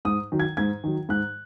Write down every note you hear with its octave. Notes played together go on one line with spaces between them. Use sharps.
G#2 D#6
D#3 F#3
G#6
G#2 G#6
D#3 F#3
G#2 F#6